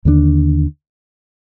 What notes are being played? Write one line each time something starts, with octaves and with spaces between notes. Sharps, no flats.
D#2 D3 G3 D4